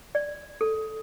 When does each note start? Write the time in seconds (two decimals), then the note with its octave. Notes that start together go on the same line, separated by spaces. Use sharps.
0.15 D5
0.61 A4